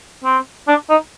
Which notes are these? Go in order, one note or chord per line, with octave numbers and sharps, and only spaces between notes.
C4
D4
D#4